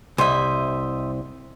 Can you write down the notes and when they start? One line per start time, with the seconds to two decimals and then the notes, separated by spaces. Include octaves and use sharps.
0.18 C2 C5 D#5 E5